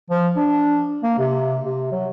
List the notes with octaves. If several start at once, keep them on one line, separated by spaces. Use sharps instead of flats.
F3
D4
A#3
C3
C3
F#3